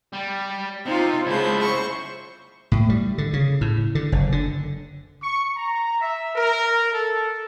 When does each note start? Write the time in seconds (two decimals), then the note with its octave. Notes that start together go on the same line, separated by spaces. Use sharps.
0.13 G3
0.86 C3 D#4 F4 C5
1.26 C#3 F3 G#3 E4 G6
1.58 C5 C#6
2.72 A2
2.89 G3
3.18 D3
3.33 C#3
3.61 A2
3.95 D3
4.12 F#1
4.32 D3
5.21 C#6
5.54 A#5
6.01 E5
6.34 A#4
6.93 A4